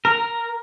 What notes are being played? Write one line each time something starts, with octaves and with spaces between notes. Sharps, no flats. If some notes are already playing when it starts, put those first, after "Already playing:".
A#4